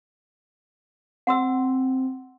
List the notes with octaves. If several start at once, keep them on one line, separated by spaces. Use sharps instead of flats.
C4 F#5 C6 E6